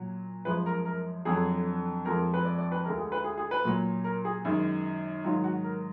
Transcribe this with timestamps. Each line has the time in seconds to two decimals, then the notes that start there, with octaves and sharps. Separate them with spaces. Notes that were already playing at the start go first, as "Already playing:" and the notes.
Already playing: A#2 F#3
0.45 F#2 F3 G#3 B4
0.66 A#4
0.85 A#4
1.25 F2 D3 F#3 G#4
2.05 F2 F3 G#3 A#4
2.34 B4
2.45 D5
2.58 D5
2.72 B4
2.85 D2 D3 G#3 A#4
2.98 G#4
3.12 B4
3.24 G#4
3.37 G#4
3.51 B4
3.65 A#2 F#3
4.04 A#4
4.25 G#4
4.45 F#2 D#3 G#3
5.24 G#2 D#3 F#3 F4
5.44 F#4
5.64 A#4